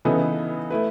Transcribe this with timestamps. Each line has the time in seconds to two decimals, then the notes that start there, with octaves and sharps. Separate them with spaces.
0.05 C#3 E3 B3 D#4 A4
0.70 A3 E4 B4